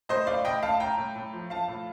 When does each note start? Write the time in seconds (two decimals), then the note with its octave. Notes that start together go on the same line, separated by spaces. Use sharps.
0.09 A2 C5 D#5
0.27 A2 D5 F5
0.45 A2 D#5 G5
0.63 A2 F5 A5
0.80 A2 G5 A#5
0.98 A2
1.16 A2
1.33 F3
1.50 F3 F5 A5
1.68 A2